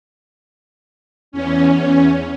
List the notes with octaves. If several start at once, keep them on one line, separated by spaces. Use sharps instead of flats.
E2 C#4